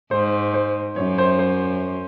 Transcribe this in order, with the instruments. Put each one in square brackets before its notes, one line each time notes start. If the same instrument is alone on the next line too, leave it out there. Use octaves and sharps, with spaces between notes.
[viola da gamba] G#2 [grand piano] C5
[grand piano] C5
[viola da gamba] F#2 [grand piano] C#5
[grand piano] C5
C5